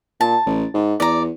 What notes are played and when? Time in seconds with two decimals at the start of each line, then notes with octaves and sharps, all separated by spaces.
0.21 A#2 A5
0.46 A1
0.74 G#2
1.00 E2 D5 A#5